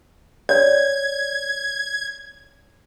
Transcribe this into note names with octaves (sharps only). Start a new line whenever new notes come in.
C#5 D5 G#6